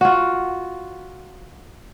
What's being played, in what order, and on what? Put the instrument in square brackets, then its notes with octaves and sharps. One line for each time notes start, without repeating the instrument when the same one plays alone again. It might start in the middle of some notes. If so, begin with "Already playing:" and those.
[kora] F4 F#4